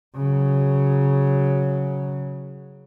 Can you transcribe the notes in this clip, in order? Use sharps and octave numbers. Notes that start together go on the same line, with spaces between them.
C#3 F#3